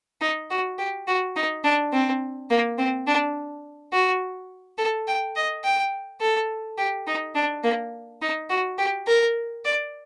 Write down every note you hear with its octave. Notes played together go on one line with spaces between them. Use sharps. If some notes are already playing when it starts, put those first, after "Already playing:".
D#4
F#4
G4
F#4
D#4
D4
C4
A#3
C4
D4
F#4
A4
G5
D#5
G5
A4
G4
D#4
D4
A#3
D#4
F#4
G4
A#4
D5